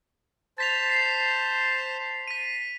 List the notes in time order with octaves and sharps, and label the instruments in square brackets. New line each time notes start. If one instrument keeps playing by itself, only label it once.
[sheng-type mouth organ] C5 A5 [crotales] A6 B6 F7
[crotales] C7
B6 D#7